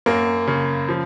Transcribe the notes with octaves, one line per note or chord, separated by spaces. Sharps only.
F#2 A#3
C#3
F3